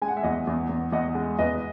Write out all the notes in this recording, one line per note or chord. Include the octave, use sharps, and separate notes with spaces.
G#3 G#5
F#5
E5
E2 D#5 F#5
E2
E2
E2 D#5 F#5
G#3
E2 B4 D#5